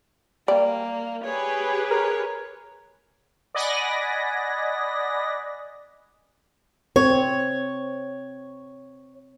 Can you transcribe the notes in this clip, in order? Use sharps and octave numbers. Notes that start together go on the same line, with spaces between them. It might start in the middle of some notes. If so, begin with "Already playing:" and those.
G3 A#3 D5
G4 G#4 B4 C#5
A#4 C#5
D5 D#5 F#5 G#5 B5 A#6
C4 C#5